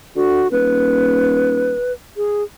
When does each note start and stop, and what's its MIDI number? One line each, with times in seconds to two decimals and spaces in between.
0.16 0.45 50
0.16 0.48 66
0.52 1.77 27
0.52 1.92 71
2.17 2.43 68